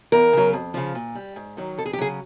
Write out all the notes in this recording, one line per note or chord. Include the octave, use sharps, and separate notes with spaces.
E2 A#4
C#3 F#3
F2
C#3 F3
A#2
G3
G#2
D#3 F#3
F2 A4
G#4
G4
C#3 F#3 G#4